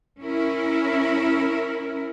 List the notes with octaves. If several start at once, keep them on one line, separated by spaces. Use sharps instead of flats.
C#4 E4 A#4